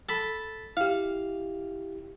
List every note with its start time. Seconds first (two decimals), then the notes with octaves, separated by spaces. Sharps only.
0.09 A4 B5
0.77 E4 G4 F5